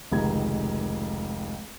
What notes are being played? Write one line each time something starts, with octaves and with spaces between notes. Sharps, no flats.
F1 C#2 D#3 A#5 G#6